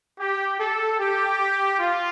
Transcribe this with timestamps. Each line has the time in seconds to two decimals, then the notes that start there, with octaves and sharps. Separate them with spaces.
0.19 G4
0.60 A4
0.99 G4
1.79 F4